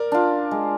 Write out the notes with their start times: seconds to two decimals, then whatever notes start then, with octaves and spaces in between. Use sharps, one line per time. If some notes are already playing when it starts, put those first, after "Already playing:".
Already playing: A#4 D5
0.12 D4 F4
0.51 G#3